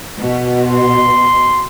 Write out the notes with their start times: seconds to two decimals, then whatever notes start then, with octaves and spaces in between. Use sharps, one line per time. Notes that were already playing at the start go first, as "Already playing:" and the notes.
0.19 B2
0.63 C6